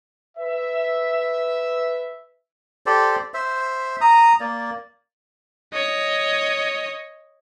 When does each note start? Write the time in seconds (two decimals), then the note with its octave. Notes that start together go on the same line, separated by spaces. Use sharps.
0.38 B4 E5
2.86 G4 A4 C5 D5
3.34 C5 E5
4.01 A#5 D#6
4.40 A#3 D5
5.73 C#5 D#5